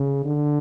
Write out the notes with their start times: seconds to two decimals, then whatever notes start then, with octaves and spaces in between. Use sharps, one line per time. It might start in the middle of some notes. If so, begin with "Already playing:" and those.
Already playing: C#3
0.25 D3